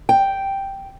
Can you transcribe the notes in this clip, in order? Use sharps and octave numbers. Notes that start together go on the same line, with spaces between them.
G5